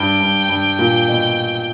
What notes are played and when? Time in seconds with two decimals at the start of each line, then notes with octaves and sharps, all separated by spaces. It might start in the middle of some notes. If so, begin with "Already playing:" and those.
Already playing: G2 G5
0.20 G2
0.49 G2
0.79 A#2
1.08 B2